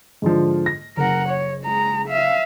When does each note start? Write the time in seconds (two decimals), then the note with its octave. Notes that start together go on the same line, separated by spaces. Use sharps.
0.22 G#2 D3 F3
0.66 A#6
0.97 F#1 A#4 F#5
1.29 C#5
1.65 G#3 A#5
2.09 E5 F5